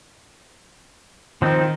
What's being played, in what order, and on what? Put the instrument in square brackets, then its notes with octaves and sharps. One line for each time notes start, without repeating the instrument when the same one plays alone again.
[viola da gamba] D#3 [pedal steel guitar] F3 C4 D#4